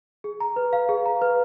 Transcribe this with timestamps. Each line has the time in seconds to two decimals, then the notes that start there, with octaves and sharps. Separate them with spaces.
0.24 G#4
0.40 A#5
0.56 B4
0.73 F5
0.89 G#4
1.06 A#5
1.22 B4